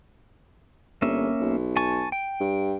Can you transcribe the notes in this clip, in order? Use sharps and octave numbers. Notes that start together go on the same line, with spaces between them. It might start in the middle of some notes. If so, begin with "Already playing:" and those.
G1 A#3 C#4 E5
B1
G#5 A5 C#6
G5
G2